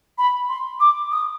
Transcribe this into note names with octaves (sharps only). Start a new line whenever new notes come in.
B5
C6
D6
D#6